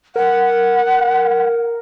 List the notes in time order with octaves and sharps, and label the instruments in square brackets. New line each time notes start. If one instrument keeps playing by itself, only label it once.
[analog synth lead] A#4 [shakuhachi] F#5